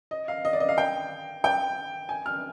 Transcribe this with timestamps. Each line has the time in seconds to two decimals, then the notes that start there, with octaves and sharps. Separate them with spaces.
0.11 D#5
0.28 F5
0.45 D#5
0.53 D5
0.60 D#5
0.69 F5
0.78 G5
1.44 G5
2.09 G#5
2.26 F6